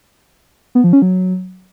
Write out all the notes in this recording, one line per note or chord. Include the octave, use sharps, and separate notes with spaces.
B3
F3
C#4
F#3